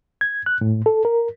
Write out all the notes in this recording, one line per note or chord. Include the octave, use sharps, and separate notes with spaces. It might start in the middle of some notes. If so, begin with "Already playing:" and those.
G#6
F#6
A2
A4
A#4